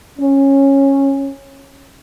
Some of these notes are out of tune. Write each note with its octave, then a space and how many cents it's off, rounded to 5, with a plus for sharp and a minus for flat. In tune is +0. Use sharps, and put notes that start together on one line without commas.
C#4 -15